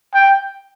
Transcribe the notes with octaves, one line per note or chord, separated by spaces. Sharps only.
G5